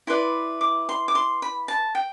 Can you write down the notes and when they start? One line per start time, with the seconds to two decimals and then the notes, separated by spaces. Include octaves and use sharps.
0.07 E4 B4 D5 C6
0.61 D6
0.89 C6
1.08 D6
1.15 C6
1.42 B5
1.68 A5
1.95 G5